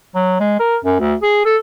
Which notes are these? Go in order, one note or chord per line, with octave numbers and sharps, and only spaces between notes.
F#3
G#3
A#4
F#2
D2
G#4
A4